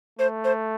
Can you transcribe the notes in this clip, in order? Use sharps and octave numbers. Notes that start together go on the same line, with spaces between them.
A3 C5
C5